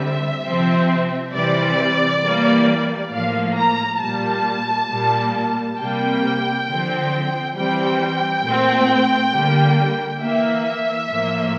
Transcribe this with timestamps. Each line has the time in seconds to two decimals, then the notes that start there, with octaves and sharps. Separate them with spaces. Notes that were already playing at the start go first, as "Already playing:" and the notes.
Already playing: D3 G3 C4 E5
0.45 C3 F3 C4
1.34 C3 E3 G3 C4 D5
2.23 E3 G3 A#3
3.12 A2 F3 A#3 F5
3.57 A#5
4.01 A#2 G3 A#3 A5
4.89 A#2 G3 A#3
5.78 C3 G3 A#3 G5
6.67 D3 F3 C4
7.56 E3 G3 C4 G5
8.44 A#2 A3 C4
9.33 D3 G3 A#3
10.21 E3 A#3 E5
11.11 A2 F3 A#3